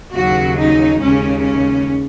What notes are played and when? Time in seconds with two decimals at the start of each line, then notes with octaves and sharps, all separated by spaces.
0.14 D#2 C#3 F#3 F#4
0.58 D#4
1.00 D#2 C#3 G#3 C#4
1.44 C#4